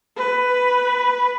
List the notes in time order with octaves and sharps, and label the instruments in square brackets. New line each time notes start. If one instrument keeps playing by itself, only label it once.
[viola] B4